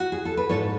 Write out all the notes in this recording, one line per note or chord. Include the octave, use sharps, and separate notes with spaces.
F#4
G#4
A4
B4
G#2 A4 C#5